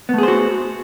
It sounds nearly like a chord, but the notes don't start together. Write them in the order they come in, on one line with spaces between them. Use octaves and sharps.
B3 A3 G#4 C5 F#4